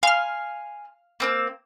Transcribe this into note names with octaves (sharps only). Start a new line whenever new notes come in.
F5 G#5 C6 F6
A#3 C4 E6